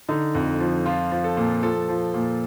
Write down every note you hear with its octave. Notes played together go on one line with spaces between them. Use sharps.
D3 D#4
F2
F3
F3 F4
F3
A4
A#2
F3 A4
F3
A#2